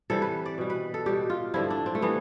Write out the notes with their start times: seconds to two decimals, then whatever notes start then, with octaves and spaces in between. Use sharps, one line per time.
0.10 C3 E3 G3 A4
0.22 B4
0.46 D5
0.58 B2 G3
0.70 B4
0.94 A4
1.06 B2 G3 G4
1.30 F4
1.54 G2 D3 F3 E4
1.71 D4
1.86 C4
1.95 A3
2.02 E3 G3 B3